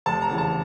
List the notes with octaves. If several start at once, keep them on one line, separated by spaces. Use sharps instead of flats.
F1 A5
A#5
E2 C#3
A5